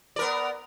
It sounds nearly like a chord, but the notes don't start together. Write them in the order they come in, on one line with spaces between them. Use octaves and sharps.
D5 A#4 B3